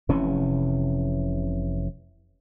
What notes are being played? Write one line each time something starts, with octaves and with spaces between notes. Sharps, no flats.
F1 C3 E3 C#4